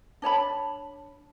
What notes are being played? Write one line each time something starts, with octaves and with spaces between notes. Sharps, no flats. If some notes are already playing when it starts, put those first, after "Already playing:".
D4 C#5 A5 B5